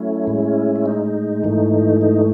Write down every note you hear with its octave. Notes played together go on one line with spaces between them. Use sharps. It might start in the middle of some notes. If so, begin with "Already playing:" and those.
Already playing: F#3 A3 C#4 E4
A2 G#3
E4
D#4
G#2 E3 A3
D#4